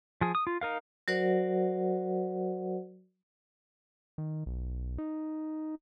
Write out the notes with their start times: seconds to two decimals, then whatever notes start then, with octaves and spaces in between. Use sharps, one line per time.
0.21 F3 G#4
0.35 D#6
0.47 F4
0.61 D#4 A#4 F5
1.08 F#3 F#4 A#4 C5 D5 F#5
4.18 D#3
4.46 B1
4.98 D#4